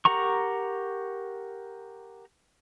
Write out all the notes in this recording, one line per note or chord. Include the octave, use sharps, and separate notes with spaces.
G4 A#4 F#5 A#5 C#6